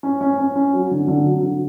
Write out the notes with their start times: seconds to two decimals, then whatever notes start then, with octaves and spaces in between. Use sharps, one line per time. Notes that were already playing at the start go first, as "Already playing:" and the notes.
0.03 C#4
0.21 C#4
0.38 C#4
0.56 C#4
0.74 F#3
0.91 D3
1.08 D3
1.25 F#3
1.43 D3